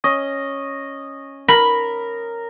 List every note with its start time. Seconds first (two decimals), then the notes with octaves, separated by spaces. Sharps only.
0.04 C#4 D#5
1.48 A#4 B5